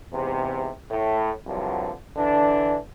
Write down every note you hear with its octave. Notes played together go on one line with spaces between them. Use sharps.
E2 G#2 C3
A2
C2 G2 D3 F3 F#3
D3 E3 D4